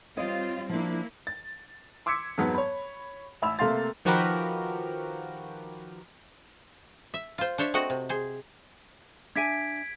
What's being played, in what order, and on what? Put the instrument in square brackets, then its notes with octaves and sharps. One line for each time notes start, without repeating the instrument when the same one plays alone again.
[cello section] G3 C4 F4 [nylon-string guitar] C#5 D#5
[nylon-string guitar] F3 D4 [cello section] A#3 E4
[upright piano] A6
C6 D6 E6 G#6 B6 C#7
F2 G#2 F#3 B3
C#5 B5
A1 E5 B5 E6 F7
C3 A3 A#3 F5 C6 A6
[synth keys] D#3 F3 F#4 G4 A#4 B4
[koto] E5
F4 C5
D4 C5 C#5 E5
A3 C4 F#4 D#5 F#5
C3
G#4 C5
[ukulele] D4 E5 G#5 [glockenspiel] G#6 B6 D7